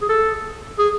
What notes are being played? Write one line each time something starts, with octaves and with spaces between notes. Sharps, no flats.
G#4
A4
G#4